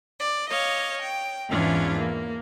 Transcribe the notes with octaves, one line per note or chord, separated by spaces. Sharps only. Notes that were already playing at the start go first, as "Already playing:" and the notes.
D5
C#5 D#5 F5
G5
E2 G#2 E3 C#4 D4 F4
A#3